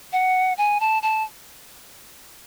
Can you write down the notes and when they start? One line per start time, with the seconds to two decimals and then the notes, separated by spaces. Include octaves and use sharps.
0.13 F#5
0.58 G#5
0.80 A5
1.03 A5